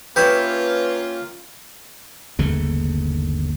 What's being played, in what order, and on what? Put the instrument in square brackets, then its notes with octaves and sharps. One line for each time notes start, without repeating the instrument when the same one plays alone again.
[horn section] A#3 C#4 F4 [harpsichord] G4 C#5 E5 [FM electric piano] B4
[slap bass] G1 D#2 C#3 A3